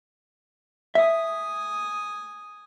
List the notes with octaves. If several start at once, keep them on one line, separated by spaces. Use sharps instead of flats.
E5 G#5 D#6